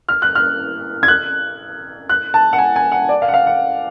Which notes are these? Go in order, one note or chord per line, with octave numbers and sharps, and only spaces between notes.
F6
F#6
F6
G#6
F#6
F#6
A5
F#5
G#5
G#5
F#5
D5
F5
F#5
F5
F#5